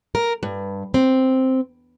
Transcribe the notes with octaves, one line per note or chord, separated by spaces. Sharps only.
A#4
G2
C4